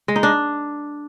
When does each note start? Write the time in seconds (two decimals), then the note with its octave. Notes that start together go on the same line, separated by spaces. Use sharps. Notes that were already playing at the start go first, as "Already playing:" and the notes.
0.08 G#3
0.16 D#4
0.23 D4